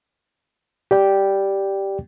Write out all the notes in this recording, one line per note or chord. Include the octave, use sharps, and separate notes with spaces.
G4 D5 G5